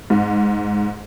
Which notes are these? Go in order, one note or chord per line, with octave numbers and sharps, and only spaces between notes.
G#2